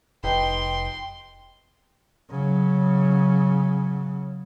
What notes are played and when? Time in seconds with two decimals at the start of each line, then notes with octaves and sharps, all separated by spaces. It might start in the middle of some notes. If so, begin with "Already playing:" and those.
0.24 F1 D#4 G4 B4 G5 C6
2.31 C#3 F#3